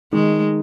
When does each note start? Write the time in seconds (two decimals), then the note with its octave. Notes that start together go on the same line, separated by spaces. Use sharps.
0.12 D#3 G#3